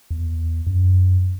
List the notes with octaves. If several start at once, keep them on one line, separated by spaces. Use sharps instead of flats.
E2
F#2